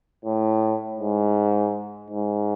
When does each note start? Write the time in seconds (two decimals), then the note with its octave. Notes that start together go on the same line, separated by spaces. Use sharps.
0.25 A2
0.99 G#2
2.11 G#2